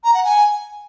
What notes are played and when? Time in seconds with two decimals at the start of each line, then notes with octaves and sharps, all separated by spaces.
0.04 A#5
0.14 F#5
0.24 G#5